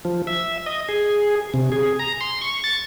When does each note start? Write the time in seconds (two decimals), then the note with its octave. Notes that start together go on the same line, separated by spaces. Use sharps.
0.05 F3
0.27 E5
0.66 D#5
0.89 G#4
1.54 C3
1.72 G#4
1.99 A#5
2.21 C6
2.42 C#6
2.64 A6